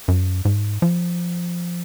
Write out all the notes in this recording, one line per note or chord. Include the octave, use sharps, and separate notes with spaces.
F#2
G#2
F3